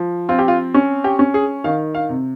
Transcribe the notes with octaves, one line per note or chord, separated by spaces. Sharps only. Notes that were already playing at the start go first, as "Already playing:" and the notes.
Already playing: F3
C4 F4
G4
F4
C#4
G4
C#4
G#4
D#3 F5
F5
C3